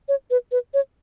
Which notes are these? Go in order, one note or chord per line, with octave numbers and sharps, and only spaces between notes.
C#5
B4
B4
C#5